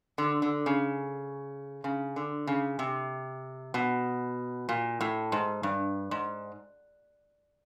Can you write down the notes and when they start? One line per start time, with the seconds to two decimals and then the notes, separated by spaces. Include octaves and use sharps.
0.18 D3
0.42 D3
0.66 C#3
1.84 C#3
2.16 D3
2.47 C#3
2.79 C3
3.74 B2
4.69 A#2
5.01 A2
5.32 G#2
5.63 G2
6.11 G#2